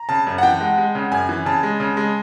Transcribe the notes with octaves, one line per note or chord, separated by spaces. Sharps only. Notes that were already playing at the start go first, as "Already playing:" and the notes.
Already playing: A#5
C#3 A5
F#2
F#5
E3 G5
G#3
G#3
C#3
F#2 G#5
E3
C#3 A5
G#3
C#3
G#3